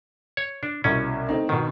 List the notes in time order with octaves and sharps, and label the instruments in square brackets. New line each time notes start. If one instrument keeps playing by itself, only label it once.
[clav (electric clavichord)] C#5
D4
[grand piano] C2 B2 [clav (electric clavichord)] C#4
[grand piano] A3 C4 D#4
[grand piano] B2 B3 [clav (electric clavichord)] D#3